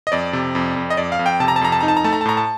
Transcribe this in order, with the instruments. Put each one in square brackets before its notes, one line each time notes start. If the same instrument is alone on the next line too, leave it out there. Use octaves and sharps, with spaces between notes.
[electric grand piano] D#5
F2 D5
C3
F2
F2
D#5
F2 D5
F5
F2
G5
C3 A5
A#5
A5
F2 A#5
A5
D#4 A#5
A5
A#5
A3 A5
A#5
A5
A2 A#5
A5